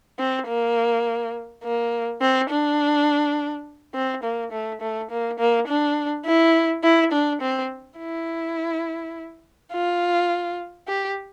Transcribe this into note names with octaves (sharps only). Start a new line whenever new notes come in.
C4
A#3
A#3
C4
D4
C4
A#3
A3
A3
A#3
A#3
D4
E4
E4
D4
C4
E4
F4
G4